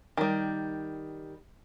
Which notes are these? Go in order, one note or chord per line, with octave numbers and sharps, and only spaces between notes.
D#3 G3